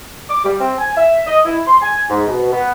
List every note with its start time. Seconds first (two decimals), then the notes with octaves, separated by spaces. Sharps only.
0.29 D6
0.44 G3
0.60 C4
0.78 G#5
0.96 E5
1.27 D#5
1.46 E4
1.67 C6
1.81 G#5
2.09 G#2
2.27 B2
2.52 B3